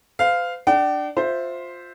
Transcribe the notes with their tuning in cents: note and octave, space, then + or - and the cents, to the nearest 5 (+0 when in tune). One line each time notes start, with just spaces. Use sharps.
C5 -45 F5 +0
D4 +10 G5 -45
F4 +20 C5 +0 E5 +0